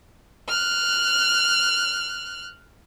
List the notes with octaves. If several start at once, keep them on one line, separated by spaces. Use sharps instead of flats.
F6 F#6